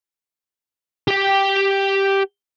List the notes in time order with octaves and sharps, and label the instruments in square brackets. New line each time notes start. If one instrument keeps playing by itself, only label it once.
[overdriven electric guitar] G4 G5